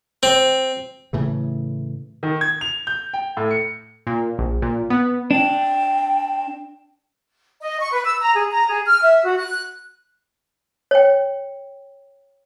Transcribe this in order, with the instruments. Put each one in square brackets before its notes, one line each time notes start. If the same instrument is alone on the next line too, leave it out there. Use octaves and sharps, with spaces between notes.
[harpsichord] C4
[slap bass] A2 C#3 E3
[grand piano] D#3
G#6
F7
G6
G5
A2
C#7
[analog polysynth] A#2
A#1
A#2
B3
[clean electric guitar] D4 [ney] G5
[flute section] D#5
C#6
B4
E6
A#5
G#4
A#5
G#4
F6
E5
F#4
F#6
[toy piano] C#5 G5